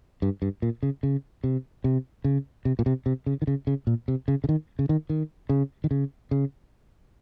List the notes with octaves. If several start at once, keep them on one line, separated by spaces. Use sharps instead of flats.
G2
G2
A#2
C#3
C#3
C3
C3
C#3
C3
A#2
C3
C3
C#3
D#3
C#3
C#3
A#2
C3
C#3
C#3
D#3
C#3
D#3
D#3
C#3
D#3
C#3
C#3